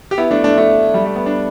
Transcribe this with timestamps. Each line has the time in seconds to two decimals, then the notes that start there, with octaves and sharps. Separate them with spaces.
0.11 G4
0.18 B3 E4
0.31 A3 D4
0.44 A3 D4
0.58 A3 D4
0.94 G3
1.05 A3
1.16 B3
1.26 D4